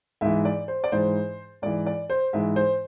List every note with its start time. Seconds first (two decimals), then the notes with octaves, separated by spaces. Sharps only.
0.21 G#2 E3 E5
0.45 D5
0.68 C5
0.84 D5
0.92 G#2 E3 C5
1.62 G#2 E3 D5
1.86 D5
2.10 C5
2.33 G#2 E3 E5
2.56 C5